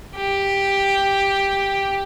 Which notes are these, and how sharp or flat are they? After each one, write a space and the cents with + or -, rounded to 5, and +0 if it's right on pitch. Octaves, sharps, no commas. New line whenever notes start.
G4 +5